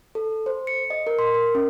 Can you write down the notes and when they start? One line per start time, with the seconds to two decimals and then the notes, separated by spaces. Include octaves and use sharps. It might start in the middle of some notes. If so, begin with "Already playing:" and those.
0.15 A4
0.46 C5
0.67 C#7
0.90 D#5
1.07 A#4
1.19 C6
1.34 A#4
1.55 C#4